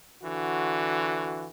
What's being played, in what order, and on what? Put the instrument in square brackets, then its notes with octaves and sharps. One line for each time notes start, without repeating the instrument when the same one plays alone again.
[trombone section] D3 E3 F#4